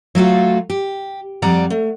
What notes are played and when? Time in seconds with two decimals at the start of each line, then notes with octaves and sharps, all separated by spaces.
0.15 F#3 A3 F4 F#4
0.70 G4
1.42 F2 G3 D5 F#5 A#5
1.70 A3